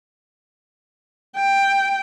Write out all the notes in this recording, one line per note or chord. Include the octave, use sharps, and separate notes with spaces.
G5